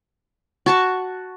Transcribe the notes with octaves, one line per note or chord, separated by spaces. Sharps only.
F#4 A5 C#6